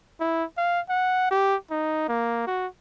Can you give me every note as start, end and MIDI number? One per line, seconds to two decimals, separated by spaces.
0.20 0.44 64
0.57 0.80 77
0.89 1.29 78
1.31 1.55 67
1.71 2.04 63
2.08 2.43 58
2.47 2.66 66